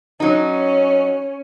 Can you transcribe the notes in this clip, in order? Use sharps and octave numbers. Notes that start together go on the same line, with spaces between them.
F#3 C#4 D#4